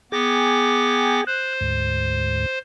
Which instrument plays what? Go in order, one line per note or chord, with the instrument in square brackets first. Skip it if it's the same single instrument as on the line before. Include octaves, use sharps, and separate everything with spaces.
[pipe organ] B3 D6 A#6 [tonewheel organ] G#4 G5 G#5
[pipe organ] C5 [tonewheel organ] F#6
[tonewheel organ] D2 G#2